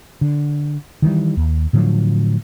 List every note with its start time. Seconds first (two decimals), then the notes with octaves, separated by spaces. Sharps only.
0.21 D3
1.02 D#3 E3 F#3 G3
1.37 D#2
1.73 A2 D3 F3 F#3